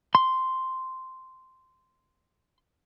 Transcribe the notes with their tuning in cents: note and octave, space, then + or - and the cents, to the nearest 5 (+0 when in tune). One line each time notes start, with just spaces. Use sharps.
C6 -5